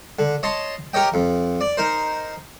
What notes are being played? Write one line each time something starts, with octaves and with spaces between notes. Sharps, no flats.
D3
C#5 D#5 A5 C6
G4 A#4 C#5 D#5 G5
F2
D5
D#4 A#4 C5